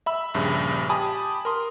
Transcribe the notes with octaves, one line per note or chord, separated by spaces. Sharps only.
E5 B5 E6
A#1 G2 C#3
G4 G#5 A5 B5 D#6
A#4 C6 D#6